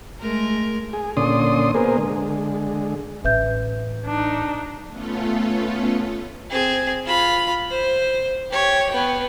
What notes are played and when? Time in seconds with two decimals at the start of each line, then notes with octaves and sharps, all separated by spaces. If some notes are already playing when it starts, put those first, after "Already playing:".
0.20 G#3 A3 A#4
0.93 G#4
1.17 A#2 D3 C#4 D5 C6 D#6
1.75 A#3 B3 G#4 A#4 C5
1.98 D3 G#3
3.24 A1 C#4 B4 E5 G6
4.06 D4 D#4
4.89 A3 B3 C#4 F4 A4
6.50 C4 G#4
7.05 F4 B5
7.71 C5
8.51 G4 C#5
8.90 B3 G5